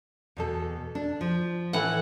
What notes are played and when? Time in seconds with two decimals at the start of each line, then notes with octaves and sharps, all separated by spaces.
0.37 E2 B2 A4
0.95 D4
1.21 F3
1.73 A2 E3 F#5